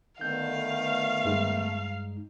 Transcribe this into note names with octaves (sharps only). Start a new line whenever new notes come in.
D3 D#3 A3 B3 F5 G6
G2 G#3 D#4